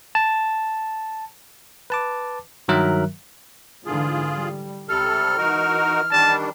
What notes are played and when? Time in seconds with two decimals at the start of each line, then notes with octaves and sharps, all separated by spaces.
0.15 A5
1.90 B4 A5 D6
2.68 G2 D#3 F#3 A#4 E5 F#6
3.86 G#2 D3 E3 F4 G#4
4.34 G3
4.89 C#2 C3 G3 A4 F6
5.38 E3 D#4 F#4 A#4
6.12 D#3 G3 D4 A5